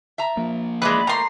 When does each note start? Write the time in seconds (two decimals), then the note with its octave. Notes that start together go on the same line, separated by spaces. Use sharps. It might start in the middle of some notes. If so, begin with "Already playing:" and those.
0.18 E5 A5 A#5
0.37 F3 A#3
0.82 E3 G#3 B4 D5
1.07 F3 A3 A#3 A#5 C6